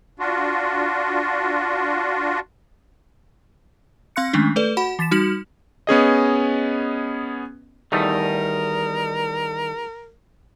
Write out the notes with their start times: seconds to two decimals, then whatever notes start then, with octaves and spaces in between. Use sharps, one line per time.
0.19 D4 F4 F#4
4.16 C4 F5 C6 F#6 C#7
4.33 D#3 G#3 A3 C#4 D4
4.56 A3 A4 B4 D5
4.77 F#4 F#5 B5
4.99 E3 A6 B6 E7
5.11 G3 D#4 F#4 F6 C#7 F#7
5.87 B3 C#4 G#4 D#5
7.92 E2 D#3 G3 A3 D#4 A#4